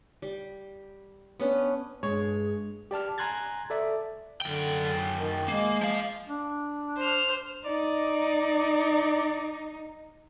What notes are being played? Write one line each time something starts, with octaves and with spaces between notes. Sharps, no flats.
G3
B3 C#4 D4
G2 G#3 G#4 C#5
G4 D5 A5 F6
G#5 A#5 C6 F#6 G#6 A6
A4 D5 E5
F#2 D3 G5
D#3
G#3 A#3
F3 F5
D4
C5 F6
D#4 D5